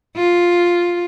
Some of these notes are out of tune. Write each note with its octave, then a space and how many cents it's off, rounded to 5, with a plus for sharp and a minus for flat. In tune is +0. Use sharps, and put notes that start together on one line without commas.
F4 +5